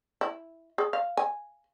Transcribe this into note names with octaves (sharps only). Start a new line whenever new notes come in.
E4
G#4
F5
G#5